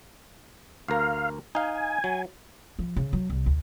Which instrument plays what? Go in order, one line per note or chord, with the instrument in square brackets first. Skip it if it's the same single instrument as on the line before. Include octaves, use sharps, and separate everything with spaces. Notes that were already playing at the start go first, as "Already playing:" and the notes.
[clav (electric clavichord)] D2 A#4 [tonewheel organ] F5
[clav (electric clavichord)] D#4 F5 [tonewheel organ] G#5
[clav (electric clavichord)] F#3
[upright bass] F3
C#3
F#3
C2
D2